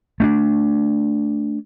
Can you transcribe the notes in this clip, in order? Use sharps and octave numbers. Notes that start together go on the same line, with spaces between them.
A3 C#4 D4